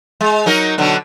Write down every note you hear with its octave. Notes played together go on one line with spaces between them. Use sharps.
G#3
F#3 D#4 A#4
B2 D3 F#3